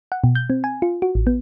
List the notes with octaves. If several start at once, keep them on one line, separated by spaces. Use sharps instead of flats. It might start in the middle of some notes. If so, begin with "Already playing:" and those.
F#5
B2
G6
C4
G#5
F4
F#4
A1
B3